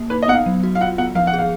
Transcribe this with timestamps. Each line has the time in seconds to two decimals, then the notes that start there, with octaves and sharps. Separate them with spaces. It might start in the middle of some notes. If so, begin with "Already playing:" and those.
Already playing: A#3
0.10 D#4 B4
0.23 D#5
0.28 B3 F#5
0.34 F5
0.46 F#3
0.63 F#4
0.75 F5
0.81 F4 F#5
0.98 B3 F#5
1.15 F3 F5
1.27 F#5
1.34 G#4 F5